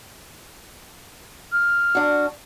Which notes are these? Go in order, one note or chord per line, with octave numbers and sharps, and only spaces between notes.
F6
D4 F#4